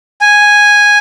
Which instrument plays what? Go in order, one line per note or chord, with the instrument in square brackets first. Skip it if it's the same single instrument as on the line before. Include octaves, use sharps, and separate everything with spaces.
[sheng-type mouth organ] G#5